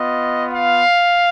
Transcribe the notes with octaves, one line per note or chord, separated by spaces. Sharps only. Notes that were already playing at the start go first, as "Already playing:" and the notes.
Already playing: B3 F4 D#5
F5